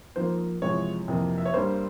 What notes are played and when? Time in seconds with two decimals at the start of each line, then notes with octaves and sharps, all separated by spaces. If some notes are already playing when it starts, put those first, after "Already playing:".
0.16 G#2 F3 A#3 C5
0.62 E2 C3 F3 G#3 C#5
1.08 F2 C3 E3 A#3
1.38 E5
1.46 C#5
1.54 G2 G3 A#3 C5